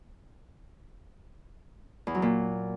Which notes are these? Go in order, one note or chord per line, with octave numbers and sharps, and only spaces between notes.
E2
F#3
A#2